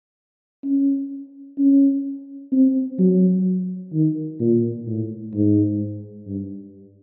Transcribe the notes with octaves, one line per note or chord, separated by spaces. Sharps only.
C#4
C#4
C4
F#3
D#3
A#2
A2
G#2
G2